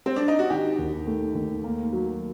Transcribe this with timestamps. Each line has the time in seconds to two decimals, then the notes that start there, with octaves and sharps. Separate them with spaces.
0.06 C4
0.16 D4
0.28 D#4
0.39 F#4
0.50 D#3 G4
0.78 D#2
1.07 A3
1.35 D#2
1.64 A#3
1.92 F#3